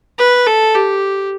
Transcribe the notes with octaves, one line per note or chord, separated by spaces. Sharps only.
B4
A4
G4